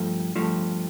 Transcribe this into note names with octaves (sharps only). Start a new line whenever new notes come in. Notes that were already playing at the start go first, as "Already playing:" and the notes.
Already playing: G2 F3 A3
G2 F3 A3